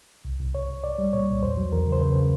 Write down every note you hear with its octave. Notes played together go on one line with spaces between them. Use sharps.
C2
C2
C2 C#5
C2
C2 D5
G3
A#2 C#5
C2
E2 C5
F#3
E2 A#4
C#3
C5
C#3 B4
C#3